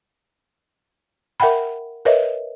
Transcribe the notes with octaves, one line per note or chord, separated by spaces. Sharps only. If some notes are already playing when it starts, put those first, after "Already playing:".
A#4 E5 F#5 G5 B5
A#4 B4 C#5 D#5 E5